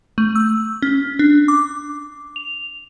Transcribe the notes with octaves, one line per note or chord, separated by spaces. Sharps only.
A3
E6
C#4
D4
D6
F7